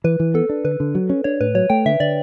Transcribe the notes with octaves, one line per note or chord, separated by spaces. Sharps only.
E3 B4
E3
B3 A4
D4
D3 B4
D3
F#3
C#4
D4 C#5
A2 B4
F#3 C#5
A3 G5
D3 E5
D3 D5